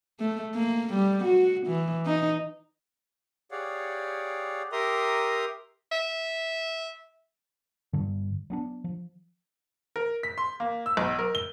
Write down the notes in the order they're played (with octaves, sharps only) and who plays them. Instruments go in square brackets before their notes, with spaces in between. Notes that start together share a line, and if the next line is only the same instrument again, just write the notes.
[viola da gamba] A3
A#3
G3
F#4
E3
D#4
[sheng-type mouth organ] G4 G#4 C#5 D5 F5 F#5
G4 A#4 E5 A#5 C6 D#6
[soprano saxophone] E5
[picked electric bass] G2 D3
F#3 B3 D4
F3
[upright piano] A#4
B6
C6
A#3
E6
B1
A#4
G7